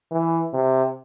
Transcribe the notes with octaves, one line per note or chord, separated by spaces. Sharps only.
E3
C3